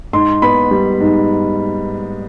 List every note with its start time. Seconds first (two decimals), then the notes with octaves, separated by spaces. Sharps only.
0.13 G#2 C6
0.42 B3 B5
0.71 G3
1.00 G#2